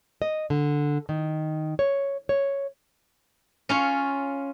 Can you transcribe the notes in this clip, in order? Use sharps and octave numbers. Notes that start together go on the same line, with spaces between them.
D#5
D3
D#3
C#5
C#5
C#4 F4 C#5